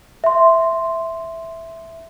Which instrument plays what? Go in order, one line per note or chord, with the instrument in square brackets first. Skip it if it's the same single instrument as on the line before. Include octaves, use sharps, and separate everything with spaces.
[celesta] E5 C6